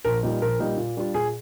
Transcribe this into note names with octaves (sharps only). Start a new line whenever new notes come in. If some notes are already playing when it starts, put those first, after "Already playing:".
A#1 A#4
A#2 G3 A#3 D#4
A#1 A#4
A#2 G3 A#3 D#4
A#2
G3 D4 F4
A#2 G#4